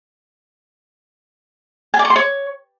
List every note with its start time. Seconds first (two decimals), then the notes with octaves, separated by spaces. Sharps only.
1.94 G#5
1.99 D5
2.05 C#6
2.10 C6
2.16 C#5